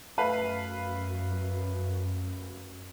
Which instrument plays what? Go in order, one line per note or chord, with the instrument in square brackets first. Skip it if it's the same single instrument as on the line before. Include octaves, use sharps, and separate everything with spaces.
[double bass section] F#2 [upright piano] A3 B4 F5